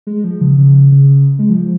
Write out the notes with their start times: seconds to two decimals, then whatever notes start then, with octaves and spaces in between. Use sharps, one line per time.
0.07 G#3
0.24 F3
0.41 C#3
0.58 C#3
0.92 C#3
1.39 G#3
1.49 F3